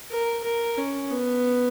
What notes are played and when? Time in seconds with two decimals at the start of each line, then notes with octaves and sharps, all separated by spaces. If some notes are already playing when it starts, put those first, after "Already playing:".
0.10 A#4
0.44 A#4
0.77 C#4
1.11 B3